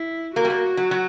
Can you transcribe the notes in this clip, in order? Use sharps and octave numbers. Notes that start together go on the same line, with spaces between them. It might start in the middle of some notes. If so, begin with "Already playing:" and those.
Already playing: E4
A#3 F#4
G3
A#3
F#3
F#3